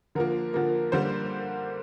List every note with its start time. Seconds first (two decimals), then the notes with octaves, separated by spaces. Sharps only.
0.15 D3 F3 A#3 A#4
0.54 D3 F3 A#3
0.92 D3 G3 A#3 C5